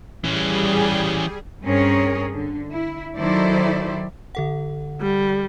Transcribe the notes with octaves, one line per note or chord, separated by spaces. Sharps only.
E3 G3 C#4 G#4
G2 C4 C#4 G#4 A#4 C#5
D3
E4
D#3 F#3 E4 A4 C5 D5
D3 A4 F#5
G3